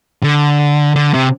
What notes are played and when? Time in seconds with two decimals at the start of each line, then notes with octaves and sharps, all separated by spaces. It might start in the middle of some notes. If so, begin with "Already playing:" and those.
0.23 D3
0.96 D3
1.14 C3